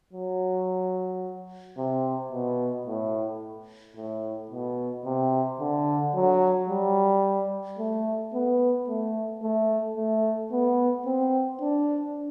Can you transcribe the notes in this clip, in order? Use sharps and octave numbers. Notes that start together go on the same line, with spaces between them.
F#3
C3
B2
A2
A2
B2
C3
D3
F#3
G3
A3
B3
A3
A3
A3
B3
C4
D4